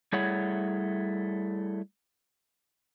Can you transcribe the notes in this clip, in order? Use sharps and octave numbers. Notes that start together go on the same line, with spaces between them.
G3 A3 E4 G#4 C#5 F#5